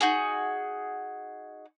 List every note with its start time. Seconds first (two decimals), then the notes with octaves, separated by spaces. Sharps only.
0.01 D#4 F#4 G#4